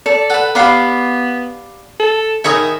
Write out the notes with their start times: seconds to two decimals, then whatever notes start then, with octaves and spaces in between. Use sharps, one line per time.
0.06 A4 D5
0.30 A4 B4 F#5
0.55 B3 D4 G4 F5 F#5 B5
2.00 A4
2.44 D#3 E4 G#4 A#4 C#5 E5 D#6